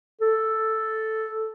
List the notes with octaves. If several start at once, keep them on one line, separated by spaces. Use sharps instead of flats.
A4